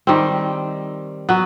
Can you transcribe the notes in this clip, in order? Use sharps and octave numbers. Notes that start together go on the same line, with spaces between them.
D#3 G3 C4
F#3 B3